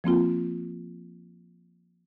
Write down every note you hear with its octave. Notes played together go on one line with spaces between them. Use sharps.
F3 A#3 C4 F4